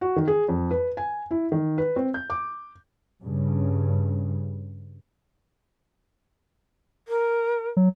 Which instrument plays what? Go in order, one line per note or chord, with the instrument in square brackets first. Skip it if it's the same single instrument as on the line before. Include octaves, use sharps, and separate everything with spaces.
[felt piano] F#4
D#3
G#4
F2
B4
G#5
E4
D#3
B4
C4
G6
D6
[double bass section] G2 C#3
[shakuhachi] A#4
[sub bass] F#3